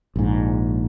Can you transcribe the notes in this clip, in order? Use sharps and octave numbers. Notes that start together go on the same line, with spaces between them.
A#1 G#2